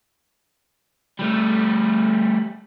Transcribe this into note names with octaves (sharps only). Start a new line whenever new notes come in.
G3 A3